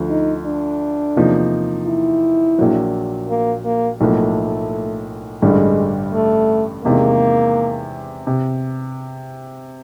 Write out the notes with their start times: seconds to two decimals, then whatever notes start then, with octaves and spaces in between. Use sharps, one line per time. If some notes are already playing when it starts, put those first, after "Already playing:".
Already playing: D2 D3 F3
0.10 D#4
0.45 D4
1.16 E2 C3 F3 A#3 D#4
1.87 E4
2.59 A#1 A#2 F#3
3.29 A#3
3.65 A#3
4.00 B1 A2 F3 A3 A#3
5.42 A1 G2 D3 G3 G#3
6.14 A3
6.84 E2 C3 D#3 G#3 A#3
8.27 C3